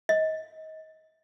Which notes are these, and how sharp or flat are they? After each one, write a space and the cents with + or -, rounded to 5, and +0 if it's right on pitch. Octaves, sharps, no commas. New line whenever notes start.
D#5 +25